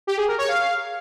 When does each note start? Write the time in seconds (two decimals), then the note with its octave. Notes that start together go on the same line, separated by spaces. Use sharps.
0.07 G4
0.18 G#4
0.28 A#4
0.38 C#5
0.48 F5